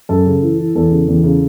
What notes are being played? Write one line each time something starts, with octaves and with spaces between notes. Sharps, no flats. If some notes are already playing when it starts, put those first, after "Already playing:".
F#2 A4
C#3
E3
E3
E2 A4
C#3
E2
C#3